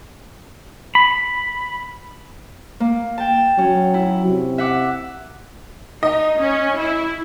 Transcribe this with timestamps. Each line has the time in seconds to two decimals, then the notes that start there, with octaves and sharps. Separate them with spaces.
0.95 B5
2.80 A#3
3.18 G5 A5
3.58 F#3 C#4
3.94 E4
4.27 C3
4.58 E5 F#5 D6
6.03 D#4 D#5
6.36 C#4
6.77 E4